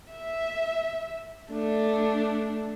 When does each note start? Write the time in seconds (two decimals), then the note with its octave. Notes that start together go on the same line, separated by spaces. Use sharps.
0.12 E5
1.51 A3 D4